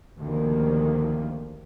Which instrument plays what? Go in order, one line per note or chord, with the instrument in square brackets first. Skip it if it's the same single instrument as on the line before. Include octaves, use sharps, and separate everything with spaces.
[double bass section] D2 C3 D#3 F3 A#3